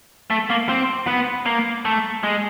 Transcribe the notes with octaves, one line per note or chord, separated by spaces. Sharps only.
A3
A#3
C4
B3
A#3
A3
G#3